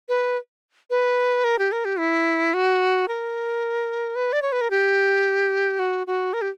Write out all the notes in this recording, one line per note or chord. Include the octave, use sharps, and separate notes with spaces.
B4
B4
A#4
G4
A#4
G4
E4
F#4
A#4
B4
D5
C#5
B4
A#4
G4
F#4
F#4
A#4
G4